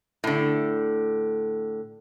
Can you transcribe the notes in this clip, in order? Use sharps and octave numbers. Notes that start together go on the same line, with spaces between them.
A2 D3